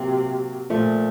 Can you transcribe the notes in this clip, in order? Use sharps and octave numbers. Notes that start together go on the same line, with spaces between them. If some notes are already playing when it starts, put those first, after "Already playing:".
Already playing: C3 F#3 A#3
A#2 F3 A3